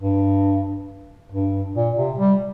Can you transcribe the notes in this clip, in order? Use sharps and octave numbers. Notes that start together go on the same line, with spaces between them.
G2
G2
A#2
C3
G3